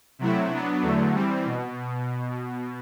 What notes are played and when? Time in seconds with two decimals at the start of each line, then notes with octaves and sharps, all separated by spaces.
0.19 C3 F#3 A3 E4
0.51 F#3 B3 D4
0.82 E2 D3 F#3 A3
1.14 E3 G3 C4
1.45 B2